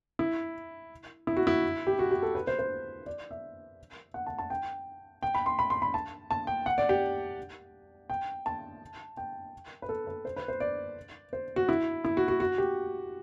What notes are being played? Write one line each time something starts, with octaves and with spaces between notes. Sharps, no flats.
E4
E4
F#4
E4
G4
F#4
G4
A4
B4
C5
C5
D5
E5
F#5
A5
A5
G5
G5
B5
C6
B5
C6
B5
A5
A5
G5
F#5
D5
G4
G5
A5
G5
B4
A4
B4
C5
B4
C5
D5
C5
F#4
E4
E4
F#4
F#4
F#4
G4